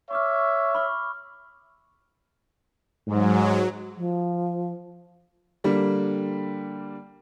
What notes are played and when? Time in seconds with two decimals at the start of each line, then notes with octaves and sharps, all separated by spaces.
0.11 C#5 E5 C#6 D6 F6
0.75 B5 C#6 F6
3.08 G#2 F#3
3.97 F3
5.64 D3 G3 A#3